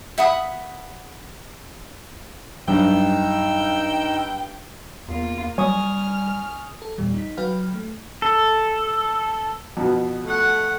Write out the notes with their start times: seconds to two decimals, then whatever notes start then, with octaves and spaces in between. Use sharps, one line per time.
0.18 E5 F#5 B5 D#6
2.68 G2 F#3 D#4 G5 E6
5.08 E2 A#3 F4
5.58 F#3 G3 G#5 C#6 D#6 F6
6.82 A4
6.98 E2 A#2 G3
7.14 D#4 B6
7.37 F#3 F#4 B4 F5 G5 F6
7.74 A3
8.22 A4
9.77 F2 B2
10.23 A3 F#5